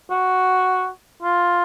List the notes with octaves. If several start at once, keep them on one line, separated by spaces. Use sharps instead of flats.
F#4
F4